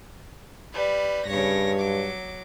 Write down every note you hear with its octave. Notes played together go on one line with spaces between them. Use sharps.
G3 B4
G2 C#3 C#5 A#6
F#3 D6